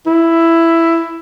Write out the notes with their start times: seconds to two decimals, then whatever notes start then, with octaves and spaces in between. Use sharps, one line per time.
0.06 E4